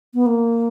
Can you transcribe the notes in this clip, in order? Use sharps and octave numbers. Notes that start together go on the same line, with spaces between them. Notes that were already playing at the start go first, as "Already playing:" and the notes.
B3
A#3